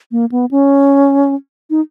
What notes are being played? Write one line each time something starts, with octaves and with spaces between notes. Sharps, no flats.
A#3
B3
C#4
D#4